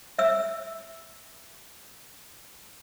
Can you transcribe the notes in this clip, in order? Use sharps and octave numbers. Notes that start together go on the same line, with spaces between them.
E5 E6